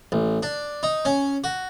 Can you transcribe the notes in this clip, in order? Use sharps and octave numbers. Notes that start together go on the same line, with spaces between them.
A1
D4
D#4
C#4
F#4